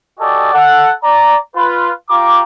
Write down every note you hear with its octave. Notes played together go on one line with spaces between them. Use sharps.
F#4 G4 A4 D5 D#5 G#5
A4 F#5
D5 A#5
F4 B4
F4 G4 A#5 D6